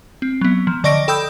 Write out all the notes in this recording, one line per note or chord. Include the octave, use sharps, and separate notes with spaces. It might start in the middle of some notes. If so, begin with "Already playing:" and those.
C4
F#3 B3
F3
D3 D5 D#5 C#6 A#6 D7
A4 G5 B5 D#6 E6 G6